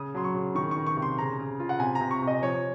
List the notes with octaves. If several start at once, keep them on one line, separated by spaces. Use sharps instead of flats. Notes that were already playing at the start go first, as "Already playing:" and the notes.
Already playing: C#3 D#6
F#3 C6
C#6
C#3
D#3 C#6
C#6
D#3
C#6
C3
C6
C#3 A#5
C#3
F4
F#5
C3 G#5
A#5
C3
C#6
C3
D#5
F3 C#5